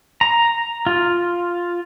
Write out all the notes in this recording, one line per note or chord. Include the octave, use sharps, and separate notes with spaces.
A#5
F4